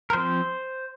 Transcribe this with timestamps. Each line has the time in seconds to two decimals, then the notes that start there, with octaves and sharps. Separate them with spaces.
0.10 A#4
0.13 F3 C4 C5